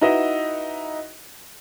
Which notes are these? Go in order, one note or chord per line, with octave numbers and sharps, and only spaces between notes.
D#4 E4 F#4 B4 D#5 E5